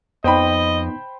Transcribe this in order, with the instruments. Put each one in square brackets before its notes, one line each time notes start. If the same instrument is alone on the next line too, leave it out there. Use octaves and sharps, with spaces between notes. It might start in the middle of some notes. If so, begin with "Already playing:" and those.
[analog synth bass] F2 [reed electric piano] B3 D#4 [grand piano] C5 G5 B5 [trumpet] D#5